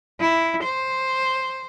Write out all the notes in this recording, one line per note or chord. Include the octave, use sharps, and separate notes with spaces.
E4
C5